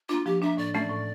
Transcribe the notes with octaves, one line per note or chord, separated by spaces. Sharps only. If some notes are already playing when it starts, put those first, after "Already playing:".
A#3 D4 F4
F3 G4
A#3 D4 E5
A2 D5
E3 A3 C#4 D5
A2